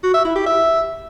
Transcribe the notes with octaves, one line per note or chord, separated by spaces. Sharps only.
F#4
E5
E4
G4
E5